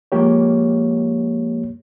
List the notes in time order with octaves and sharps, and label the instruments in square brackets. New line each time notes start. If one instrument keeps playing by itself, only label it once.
[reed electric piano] F3 G#3 A#3 G4 C#5